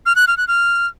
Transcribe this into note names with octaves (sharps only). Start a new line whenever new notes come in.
F6
F#6
F6
F#6
F6